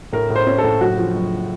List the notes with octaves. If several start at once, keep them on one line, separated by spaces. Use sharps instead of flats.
A2 A#4
A2
C5
C#4
A4
A2
F#1 F#4
F3
F#1